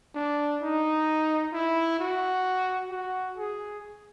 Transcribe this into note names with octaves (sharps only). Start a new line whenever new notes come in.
D4
D#4
E4
F#4
F#4
G#4